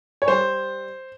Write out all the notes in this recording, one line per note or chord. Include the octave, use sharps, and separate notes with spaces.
C#5
G3 C5